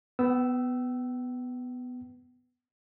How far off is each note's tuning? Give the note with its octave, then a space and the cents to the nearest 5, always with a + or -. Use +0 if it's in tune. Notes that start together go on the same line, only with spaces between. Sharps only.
B3 +10 G5 -40 E6 +0